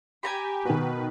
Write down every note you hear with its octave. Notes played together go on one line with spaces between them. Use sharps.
G4 G#5 A#5 B5
B2 D#3 F#4 B4